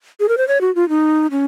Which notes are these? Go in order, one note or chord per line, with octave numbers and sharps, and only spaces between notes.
G#4
A#4
C5
C#5
F#4
F4
D#4
C#4